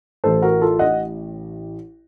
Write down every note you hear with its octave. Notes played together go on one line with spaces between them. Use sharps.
A1 A2 A4 C5
F#4 A#4
F4 A4
D#5 F#5